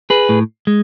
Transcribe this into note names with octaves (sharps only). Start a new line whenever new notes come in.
G#4 B4
A2
G#3